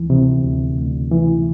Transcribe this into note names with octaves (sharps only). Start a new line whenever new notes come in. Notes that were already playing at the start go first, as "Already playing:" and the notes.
Already playing: D2 E3
C3
D2
D2
E3